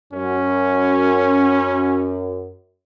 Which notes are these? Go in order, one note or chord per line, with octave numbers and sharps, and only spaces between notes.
F#2 C#4